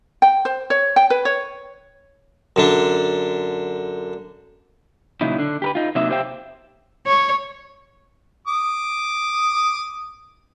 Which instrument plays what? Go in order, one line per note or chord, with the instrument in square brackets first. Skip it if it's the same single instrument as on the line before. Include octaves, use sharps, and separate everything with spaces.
[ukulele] G5
C5
C#5
G5
B4
C#5
[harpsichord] F#2 D3 D4
[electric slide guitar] A#2 C#3 F#3 D#4 E4
D3 D4
G4 A#4 B4
D#4 F4
C3 F#3 A#3 D#4 E5
G4 C5 E5 F5 G5
[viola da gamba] C#5
[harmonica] D6 D#6